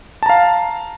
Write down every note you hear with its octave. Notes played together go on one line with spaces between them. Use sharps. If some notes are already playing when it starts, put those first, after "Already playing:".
F5 A5 A#5